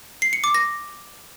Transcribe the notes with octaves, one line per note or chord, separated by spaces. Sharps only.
C7
C#7
D6
A#6